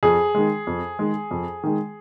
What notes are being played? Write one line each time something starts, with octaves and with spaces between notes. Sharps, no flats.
F2 G#4
D#3 G#3
F2
D#3 G#3
F2
D#3 G#3